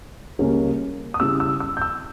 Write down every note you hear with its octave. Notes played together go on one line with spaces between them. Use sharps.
C#2 C#3 G3 A#3 C#4
D#6
C#3 G3 C#4 E4 E6
E6
E6
G6
E6